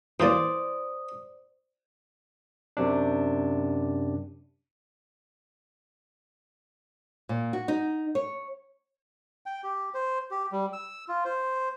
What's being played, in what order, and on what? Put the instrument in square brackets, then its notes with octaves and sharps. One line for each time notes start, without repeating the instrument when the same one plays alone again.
[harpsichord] A#2 E3 F4 [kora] C5 D5 [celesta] D#6
[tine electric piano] F#2 C3 D4
[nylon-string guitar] A#2
F#4
D#4
C#5
[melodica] G5
G4
C5
G4
G3
E6
F4
C5